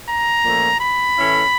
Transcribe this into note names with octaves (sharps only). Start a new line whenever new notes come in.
A#5
A#2 F3 A3 C#4
B5
A2 E3 A3 C#4 E4